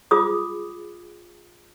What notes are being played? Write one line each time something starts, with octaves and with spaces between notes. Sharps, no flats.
F4 G#4 B5 D6 D#6